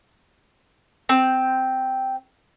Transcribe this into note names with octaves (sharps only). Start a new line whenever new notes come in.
C4